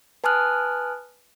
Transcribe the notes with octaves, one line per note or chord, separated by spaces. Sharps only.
B4 G#5 A5 D#6 F6 F#6